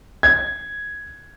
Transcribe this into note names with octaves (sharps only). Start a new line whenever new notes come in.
G#6